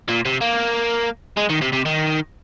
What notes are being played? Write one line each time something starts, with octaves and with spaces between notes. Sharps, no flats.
A#2
C3
A#3
G#3
D#3
C3
C3
D#3